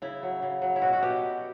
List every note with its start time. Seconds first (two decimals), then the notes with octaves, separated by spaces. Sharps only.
0.02 C#3 E4
0.23 F#3
0.42 C#3
0.62 F#3
0.76 E4
0.82 B2 F#4
0.93 F#4
1.03 B2 G4